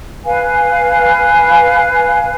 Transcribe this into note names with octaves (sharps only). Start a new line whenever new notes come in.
B4 F5 G#5